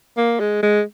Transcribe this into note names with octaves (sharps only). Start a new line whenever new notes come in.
A#3
G#3
G#3